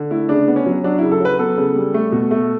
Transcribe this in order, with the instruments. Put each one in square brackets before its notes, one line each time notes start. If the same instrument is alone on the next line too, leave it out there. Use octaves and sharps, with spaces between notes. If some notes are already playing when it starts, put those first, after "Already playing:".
Already playing: [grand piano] D3
A3 E4
C#3 D4
B3
C#4
F#3
F#3 D4
C#3 E4
A4
F#3 B4
B3 A4
C#3
G3
A3
B2
A3